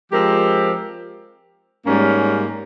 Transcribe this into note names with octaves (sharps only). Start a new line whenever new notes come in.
F3 G#3 C4 G4 A#4
G#2 G3 A#3 C#4